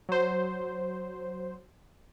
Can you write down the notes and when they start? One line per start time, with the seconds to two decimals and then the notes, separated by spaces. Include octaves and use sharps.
0.09 F#3 C5